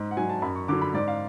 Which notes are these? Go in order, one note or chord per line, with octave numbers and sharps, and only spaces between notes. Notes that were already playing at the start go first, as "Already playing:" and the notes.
Already playing: G#2
F#5
F#3 G#5
A5
F#2 B5
C#6
D3 F#3 D6
B5
G#2 D5
F5